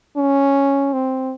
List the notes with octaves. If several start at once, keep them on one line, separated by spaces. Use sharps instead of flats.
C#4
C4